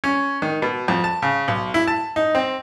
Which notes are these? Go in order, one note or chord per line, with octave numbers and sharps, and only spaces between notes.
C#4
D#3
B2
F2
A5
C#3
B1
E4
A5
D#4
C4